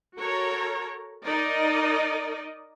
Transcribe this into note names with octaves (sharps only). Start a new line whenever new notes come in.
F#4 A4 A#4 C#5 A#5
D#4 A#4 D5 D#5